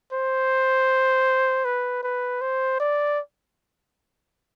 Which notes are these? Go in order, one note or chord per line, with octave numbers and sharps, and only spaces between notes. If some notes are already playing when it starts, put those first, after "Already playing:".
C5
B4
B4
C5
D5